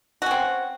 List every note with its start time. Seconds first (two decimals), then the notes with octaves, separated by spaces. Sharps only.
0.22 F#4
0.26 C#4
0.31 C4